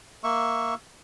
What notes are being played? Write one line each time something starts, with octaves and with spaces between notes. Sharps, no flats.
A#3 E5 C#6